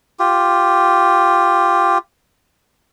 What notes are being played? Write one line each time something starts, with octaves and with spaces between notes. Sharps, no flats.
F4 G4